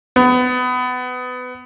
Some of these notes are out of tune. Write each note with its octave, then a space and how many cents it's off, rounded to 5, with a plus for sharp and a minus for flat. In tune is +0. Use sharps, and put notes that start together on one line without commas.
B3 +25